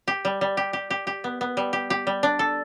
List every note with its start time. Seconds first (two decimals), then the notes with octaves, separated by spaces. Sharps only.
0.08 G4
0.25 G3
0.41 G3
0.57 G4
0.73 G4
0.90 G4
1.07 G4
1.24 B3
1.41 B3
1.57 G3
1.73 G4
1.90 G4
2.07 G3
2.23 D4
2.39 A4